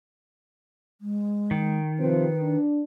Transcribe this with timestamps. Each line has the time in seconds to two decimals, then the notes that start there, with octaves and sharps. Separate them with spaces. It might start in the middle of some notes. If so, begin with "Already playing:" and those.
1.01 G#3
1.51 D#3
1.99 C3 F3 C4 B4
2.42 D4